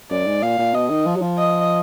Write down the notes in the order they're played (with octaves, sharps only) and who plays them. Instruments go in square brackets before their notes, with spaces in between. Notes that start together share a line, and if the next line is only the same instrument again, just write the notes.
[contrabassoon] F#2 [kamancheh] D5
[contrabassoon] G#2
[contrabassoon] A#2 [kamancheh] F5
[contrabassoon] A#2
[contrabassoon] B2 [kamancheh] D#5
[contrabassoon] D#3
F3
F#3
F3
[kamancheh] D#5